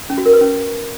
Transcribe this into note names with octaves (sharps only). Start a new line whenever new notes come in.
C#4
F#4
A#4
B4
C#4